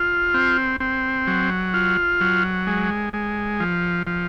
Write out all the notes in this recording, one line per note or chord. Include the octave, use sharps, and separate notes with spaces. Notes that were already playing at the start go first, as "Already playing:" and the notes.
Already playing: F4
C4
C4
F#3
F4
F#3
G#3
G#3
F3
F3